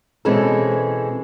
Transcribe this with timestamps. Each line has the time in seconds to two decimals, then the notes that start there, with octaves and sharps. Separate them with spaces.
0.25 B2 E3 G#3 C4 C#4 A4